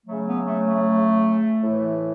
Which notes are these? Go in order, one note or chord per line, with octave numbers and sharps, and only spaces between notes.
C#3 F#3 A3
B3
A3
A3
A2 E3